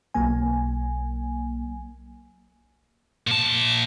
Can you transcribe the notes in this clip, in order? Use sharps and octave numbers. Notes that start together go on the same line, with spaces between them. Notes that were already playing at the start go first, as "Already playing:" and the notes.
B1 F#3 A#3 G#5
A#2 A5